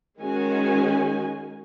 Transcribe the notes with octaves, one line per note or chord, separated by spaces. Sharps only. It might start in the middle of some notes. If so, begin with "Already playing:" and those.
D#3 G#3 C#4 F#4 G#4 G#5